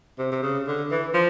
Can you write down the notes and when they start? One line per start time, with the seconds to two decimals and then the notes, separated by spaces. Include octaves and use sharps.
0.19 C3
0.32 C3
0.43 C#3
0.67 D3
0.91 E3
1.14 F3